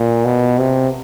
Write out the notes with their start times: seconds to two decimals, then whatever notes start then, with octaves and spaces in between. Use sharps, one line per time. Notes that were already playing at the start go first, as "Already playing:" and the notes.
Already playing: A#2
0.25 B2
0.58 C3